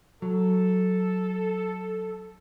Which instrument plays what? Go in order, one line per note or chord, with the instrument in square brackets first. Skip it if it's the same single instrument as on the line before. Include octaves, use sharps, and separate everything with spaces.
[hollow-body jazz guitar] F#3 [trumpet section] A4